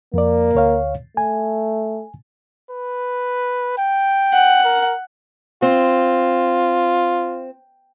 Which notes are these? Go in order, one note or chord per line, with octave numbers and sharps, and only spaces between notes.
F2 A#3 D5
D2 C#5 F5
A3 G#5
B4
G5
F#5
A#4
C4 F4